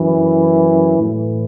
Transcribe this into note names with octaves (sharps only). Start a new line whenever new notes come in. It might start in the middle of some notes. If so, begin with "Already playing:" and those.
Already playing: F#2 E3
A2 E3